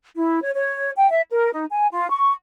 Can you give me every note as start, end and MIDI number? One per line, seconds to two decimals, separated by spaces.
0.15 0.40 64
0.42 0.50 73
0.54 0.90 73
0.96 1.08 79
1.09 1.22 76
1.29 1.48 70
1.52 1.63 63
1.70 1.87 80
1.90 2.08 65
2.08 2.32 85